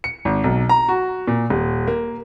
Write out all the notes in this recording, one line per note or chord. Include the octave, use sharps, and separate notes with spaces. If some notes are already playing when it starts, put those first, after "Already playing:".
C#7
G#1
B1
A#5
F#4
A#2
D#1
A#3